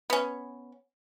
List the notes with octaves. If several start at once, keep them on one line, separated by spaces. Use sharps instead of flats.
B3 C#4